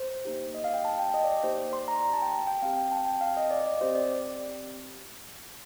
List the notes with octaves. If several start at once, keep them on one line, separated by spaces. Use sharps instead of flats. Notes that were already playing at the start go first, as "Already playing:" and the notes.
Already playing: C5
A#3 D#4 G4
D#5
F5
G5
A5
G5
D#5
D5
A#3 D#4 G4 C5
D5
C6
A#5
A#5
A5
G5
G5
G5
C4 G4 F5
G5
A5
G5
F5
D#5
D5
D#5
D5
C4 G4 C5
D5